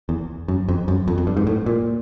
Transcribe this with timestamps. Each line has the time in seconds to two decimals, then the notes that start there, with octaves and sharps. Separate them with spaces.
0.09 E2
0.48 F#2
0.68 F2
0.88 F#2
1.08 F2
1.18 F2
1.27 G2
1.37 G#2
1.47 A2
1.66 A#2